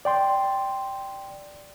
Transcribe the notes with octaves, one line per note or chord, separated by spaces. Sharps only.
D5 G5 C6